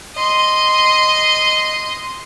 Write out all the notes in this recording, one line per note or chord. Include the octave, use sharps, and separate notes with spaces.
D#5 C6